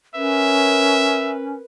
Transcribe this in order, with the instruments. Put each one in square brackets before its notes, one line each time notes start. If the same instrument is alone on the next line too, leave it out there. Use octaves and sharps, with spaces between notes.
[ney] C#4 [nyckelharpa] A#4 B4 [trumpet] E5